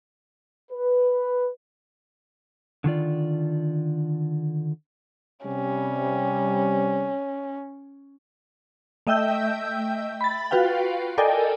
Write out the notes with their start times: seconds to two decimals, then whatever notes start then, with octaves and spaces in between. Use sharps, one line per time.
0.71 B4
2.84 D3 D#3 F4 D5
5.45 C3 G3 C#4
9.07 A3 D#5 E5 G5 E6 G6
10.21 B5 A6
10.51 F4 F#4 B4 F5 G5
11.18 A4 A#4 D5 D#5 G5 G#5